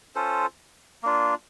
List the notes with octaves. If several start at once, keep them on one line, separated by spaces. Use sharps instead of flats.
C#4 F4 A4 C5
A#3 D4 F4